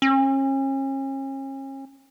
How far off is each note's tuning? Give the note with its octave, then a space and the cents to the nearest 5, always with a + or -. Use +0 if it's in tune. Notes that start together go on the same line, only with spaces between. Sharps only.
C#4 -40